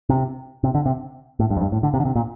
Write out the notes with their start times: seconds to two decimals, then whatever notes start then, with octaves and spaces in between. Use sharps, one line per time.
0.09 C3
0.64 C3
0.74 D3
0.86 C3
1.39 A2
1.50 G2
1.57 F2
1.61 G2
1.72 A2
1.83 D3
1.94 C3
2.00 D3
2.05 C3
2.15 A#2